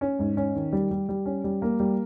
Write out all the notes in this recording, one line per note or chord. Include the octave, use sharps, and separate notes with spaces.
C#4
G#2
C#4
D#3
G3
G3
G3
C#4
G3
A#3
G3